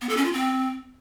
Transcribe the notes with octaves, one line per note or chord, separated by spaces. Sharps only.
B3
A4
C#4
F4
C4